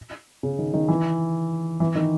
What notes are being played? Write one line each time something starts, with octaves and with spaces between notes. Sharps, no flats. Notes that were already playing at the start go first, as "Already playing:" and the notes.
C#3
D#3
D#3
E3
E3
D#3